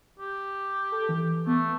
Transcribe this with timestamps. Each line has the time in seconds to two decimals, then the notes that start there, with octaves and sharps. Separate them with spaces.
0.20 G4
0.92 A4
1.09 E3
1.47 A3 B3